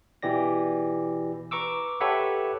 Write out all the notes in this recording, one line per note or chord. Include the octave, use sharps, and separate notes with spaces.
B2 E3 G4 D5 A#6
B4 A#5 C#6 D6 E6
G4 A4 B4 C#5 E5 F#5